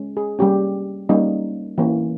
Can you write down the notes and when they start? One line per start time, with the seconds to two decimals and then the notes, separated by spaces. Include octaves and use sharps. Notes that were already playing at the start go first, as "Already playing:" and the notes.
Already playing: G#3 C#4
0.17 G#4
0.39 G3 A#3 C#4 G4
1.09 G3 A#3 C#4 D#4
1.78 E3 A#3 C#4